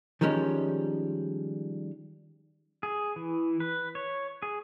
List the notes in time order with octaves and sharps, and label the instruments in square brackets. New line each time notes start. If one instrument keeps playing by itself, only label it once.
[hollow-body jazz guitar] D#3 F3 G3 G#3 C#4
[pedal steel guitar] G#4
E3
B4
C#5
G#4